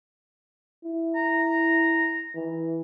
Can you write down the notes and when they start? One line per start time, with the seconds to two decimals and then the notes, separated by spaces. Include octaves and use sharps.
0.84 E4
1.15 A#5
2.35 E3